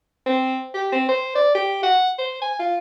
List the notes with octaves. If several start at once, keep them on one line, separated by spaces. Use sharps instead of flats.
C4
G4
C4
C5
D5
G4
F#5
C5
G#5
F4